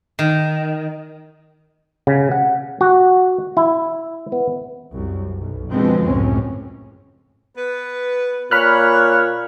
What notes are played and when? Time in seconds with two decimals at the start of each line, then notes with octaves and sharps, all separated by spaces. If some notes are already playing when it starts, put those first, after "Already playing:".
0.19 D#3
2.07 C#3
2.31 F#5
2.81 F#4
3.57 E4
4.32 B3
4.93 C2 F#2
5.36 B1
5.70 B2 D3 F3 G#3 B3 C4
6.06 C#2 F#2 A2 C4 C#4
7.56 B3 B4
8.51 A#2 C#5 B5 F6 F#6